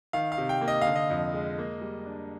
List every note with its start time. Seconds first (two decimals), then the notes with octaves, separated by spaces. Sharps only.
0.13 D#3 F5
0.32 F5
0.38 C3
0.49 G5
0.61 A#3
0.68 D#5
0.81 D3 F5
0.96 D#5
1.10 F2
1.34 G#3
1.58 A#3
1.81 G3
2.06 D4